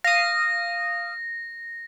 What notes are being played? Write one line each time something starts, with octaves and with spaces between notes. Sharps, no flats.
F5 D#6 A#6